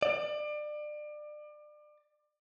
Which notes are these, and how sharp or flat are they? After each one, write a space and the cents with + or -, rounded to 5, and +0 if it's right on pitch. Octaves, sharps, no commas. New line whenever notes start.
D5 +30